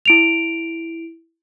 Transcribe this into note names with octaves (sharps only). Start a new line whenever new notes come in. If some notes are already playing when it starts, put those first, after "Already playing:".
E4 D7 F7